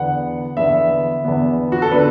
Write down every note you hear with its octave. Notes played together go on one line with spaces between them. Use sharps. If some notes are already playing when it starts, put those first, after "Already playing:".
Already playing: E2 D3 B3 F#5
E2 D3 B3 E5
E2 D3 B3
F#4
A4
D3 B3 D4 B4